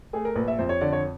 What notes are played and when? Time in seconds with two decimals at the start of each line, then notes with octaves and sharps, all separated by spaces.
0.13 A3 G#4
0.25 A#4
0.35 A#1 B4
0.48 E5
0.59 F2 C5
0.69 C#5
0.81 D3 D5
0.93 C#5